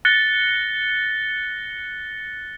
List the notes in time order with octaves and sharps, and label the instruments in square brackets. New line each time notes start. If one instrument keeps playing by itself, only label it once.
[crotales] F#6 A6 A#6 C#7 G7